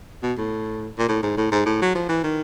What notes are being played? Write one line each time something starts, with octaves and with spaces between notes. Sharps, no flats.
B2
A2
A#2
A2
G#2
A2
G#2
A2
F#3
F3
E3
D#3